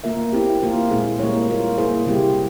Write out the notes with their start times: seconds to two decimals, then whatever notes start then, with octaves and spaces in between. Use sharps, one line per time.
0.04 A#3 F4 A#4 E5
0.33 C4 E4 G4
0.62 A#3 F4 A#4
0.91 A#2 G#3 C4 E4 G#4
1.20 G3 A#3 E4 A#4 C#5
1.48 A#3 F4 A#4
1.78 A#3 E4 G#4 C5
2.06 C3 G3 C4 E4 G4